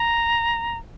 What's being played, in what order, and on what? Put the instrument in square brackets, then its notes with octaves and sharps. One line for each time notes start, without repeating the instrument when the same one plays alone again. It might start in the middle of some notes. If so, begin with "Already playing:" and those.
Already playing: [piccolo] A#5